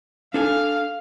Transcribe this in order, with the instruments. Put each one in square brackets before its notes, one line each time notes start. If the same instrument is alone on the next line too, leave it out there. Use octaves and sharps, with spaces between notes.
[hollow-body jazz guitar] D4 A4 G#5 [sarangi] F5